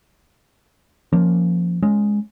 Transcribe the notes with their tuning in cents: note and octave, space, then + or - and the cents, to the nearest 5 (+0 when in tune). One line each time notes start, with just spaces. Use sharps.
F3 +0 A#3 +0 C#4 +0
G#3 +0 C#4 +0